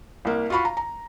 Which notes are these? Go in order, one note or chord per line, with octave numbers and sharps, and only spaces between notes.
C2 A#3
F4 F#4 F5 B5 C#6
A#5
A#5